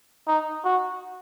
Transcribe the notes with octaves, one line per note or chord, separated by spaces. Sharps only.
D#4
F#4